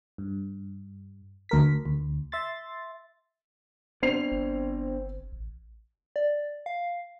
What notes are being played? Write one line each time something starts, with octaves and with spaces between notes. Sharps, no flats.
G2
D2 A#4 B6
D2
E5 C6 A6
B3 C4 D4 C7 F7
G1
A1
D5
F5